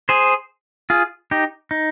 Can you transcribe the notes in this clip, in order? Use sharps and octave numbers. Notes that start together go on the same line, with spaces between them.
G#4 C5
F4 G#4
D#4 G4
D#4